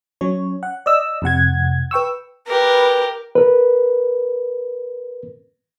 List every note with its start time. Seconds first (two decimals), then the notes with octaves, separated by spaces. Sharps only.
0.21 F#3 C#4 C#5
0.63 F#5
0.86 D5 D#5 E6
1.22 F2 C3 F#5 G#6
1.91 B4 G5 C#6 E6
2.47 G4 A#4 B4
3.35 A#4 B4